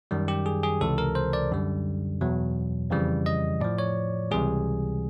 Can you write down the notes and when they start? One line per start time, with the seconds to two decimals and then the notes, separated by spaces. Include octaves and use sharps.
0.11 F#2 D#3 G3
0.28 G4
0.46 G#4
0.63 G#4
0.81 C#2 C3 E3 A4
0.98 A#4
1.15 C5
1.33 D5
1.51 F#2 D3 G3
2.21 E2 B2 F#3
2.90 F2 C#3 E3 G3
3.26 D#5
3.61 A2 F3 D5
3.78 C#5
4.31 C#2 C3 E3 G3 G#4